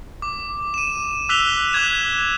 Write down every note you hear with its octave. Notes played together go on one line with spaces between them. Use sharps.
D6
D#7 E7
D6 E6 F#6 B6 F7 G7
D6 F#6 G#6 E7